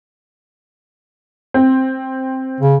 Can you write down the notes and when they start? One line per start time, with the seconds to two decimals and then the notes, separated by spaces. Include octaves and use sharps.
1.54 C4
2.61 C#3